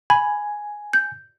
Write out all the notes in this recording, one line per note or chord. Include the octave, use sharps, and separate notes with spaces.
G#5 B5
G6